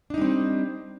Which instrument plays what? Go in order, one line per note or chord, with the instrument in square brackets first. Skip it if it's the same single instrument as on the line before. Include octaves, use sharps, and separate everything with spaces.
[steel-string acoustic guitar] D4
D#4
G3
C4